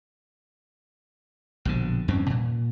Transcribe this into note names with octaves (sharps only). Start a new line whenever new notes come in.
A#1 B2 D3
E2 G2 C4 C#4
A#2